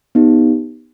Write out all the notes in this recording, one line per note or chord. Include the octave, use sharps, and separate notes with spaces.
B3 D#4 G4